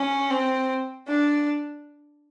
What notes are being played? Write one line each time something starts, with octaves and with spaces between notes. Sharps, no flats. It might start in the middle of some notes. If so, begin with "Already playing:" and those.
Already playing: C#4
C4
D4